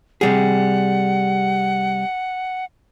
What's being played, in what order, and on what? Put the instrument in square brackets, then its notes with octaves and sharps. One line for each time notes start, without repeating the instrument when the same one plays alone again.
[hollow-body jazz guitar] C3 G3 G#4 [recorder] F#5